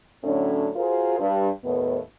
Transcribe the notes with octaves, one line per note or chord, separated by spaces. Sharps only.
A2 D3 F#3 C#4 D4
F4 F#4 G#4 A#4 C5
G2
D#2 A2 B3